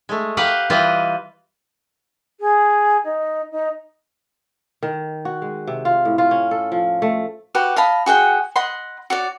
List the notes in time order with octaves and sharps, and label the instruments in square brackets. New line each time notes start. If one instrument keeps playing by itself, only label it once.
[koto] G#3 A3
G4 B4 F5 F#5 A#5
E3 G3 F4 B4 D#5
[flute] G#4
D#4
D#4
[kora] D#3
F#4
G#3
C3
F4
A2
F4
C#4
A4
F3
A3
[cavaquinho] F#4 G4 B4 F#5
D#5 F5 A5 B5
F#4 G#4 F#5 G5
D#5 F#5 B5 C6
F#4 C#5 D5